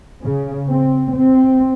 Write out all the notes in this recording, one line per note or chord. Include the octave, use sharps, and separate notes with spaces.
C#3
C4
C4